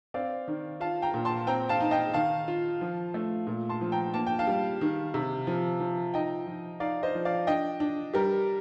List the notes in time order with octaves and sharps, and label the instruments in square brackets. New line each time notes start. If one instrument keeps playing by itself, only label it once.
[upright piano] C4 D5 F5
D#3
F4 F5 A5
G5 A#5
A#2
A5 C6
C4 G5 A#5
F5 A5
D#4
D#5 G5
D#3 F5 A5
F4
F3
A3
A#2
A5 C6
F3
G5 A#5
A#3 A5
G5
F5 A5
G3
D#3
C3
F3
F3
D#4 D#5 G5
F3
D#4 D5 F5
C5 D#5
F3
D5 F5
D4 D#5 G5
D4
G3 G4 A#4